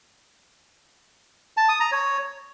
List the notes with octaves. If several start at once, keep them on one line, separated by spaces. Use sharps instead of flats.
A5
D#6
A#5
C#5